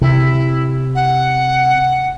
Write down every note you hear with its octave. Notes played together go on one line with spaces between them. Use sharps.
C3 E4
F#5